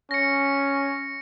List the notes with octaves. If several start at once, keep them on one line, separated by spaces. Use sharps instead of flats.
C#4 A#6 C#7